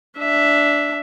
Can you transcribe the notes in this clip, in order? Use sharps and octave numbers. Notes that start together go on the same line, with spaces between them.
D4 E5